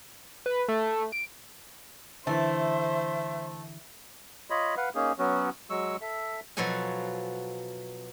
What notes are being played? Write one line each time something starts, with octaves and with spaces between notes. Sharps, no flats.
B4
A3
D7
D3 E3 A3 C5 E5
F4 C#5 D#5 B5
B4 F5 F#5
A#3 C#4 D#4 G#4
F#3 B3 C#4 F#4
F#3 G#3 C#6 E6
A4 E5
B2 F3 F#3 A4 G#5